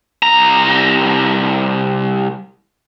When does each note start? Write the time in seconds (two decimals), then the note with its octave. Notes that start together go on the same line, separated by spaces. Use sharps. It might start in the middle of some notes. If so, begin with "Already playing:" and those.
0.23 C2 A#5